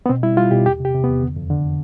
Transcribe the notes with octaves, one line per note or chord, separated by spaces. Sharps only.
B3
B2 C4
G3 E4
G3 F4
B2 G4
E2 G4
C3 G4
C3
E2 B3
D3
F2
D3